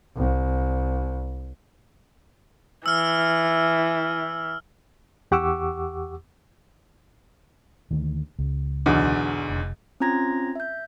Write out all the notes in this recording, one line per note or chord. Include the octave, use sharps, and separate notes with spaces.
C2
E3 E6 F6
E2 G4 F#5 C#6 D6 E6
D2 D#3
C#2
B1 E2 D3
F1
C4 C#4 F4 A#5 G#6 A#6
E5 G6